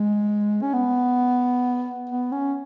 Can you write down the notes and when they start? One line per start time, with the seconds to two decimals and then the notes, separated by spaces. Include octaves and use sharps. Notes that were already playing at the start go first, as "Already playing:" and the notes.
Already playing: G#3
0.62 C#4
0.74 B3
2.10 B3
2.32 C#4